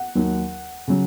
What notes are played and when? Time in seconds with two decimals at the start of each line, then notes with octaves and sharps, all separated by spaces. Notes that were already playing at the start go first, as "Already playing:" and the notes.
Already playing: F#5
0.15 D#2 D#3 F#3
0.88 C#3 F#3